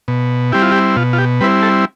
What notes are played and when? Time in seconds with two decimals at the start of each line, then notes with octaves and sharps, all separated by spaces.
0.08 B2
0.52 G3 C4 E4 G4
0.62 F4
0.72 G4
0.96 B2 F4
1.13 F4
1.18 G4
1.41 G3 C4 E4 B4
1.62 A4